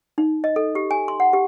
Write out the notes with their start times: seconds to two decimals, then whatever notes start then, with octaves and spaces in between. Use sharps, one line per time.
0.18 D#4
0.44 D#5
0.56 A4
0.75 G4
0.91 G#5
1.08 C6
1.20 F#5
1.33 G4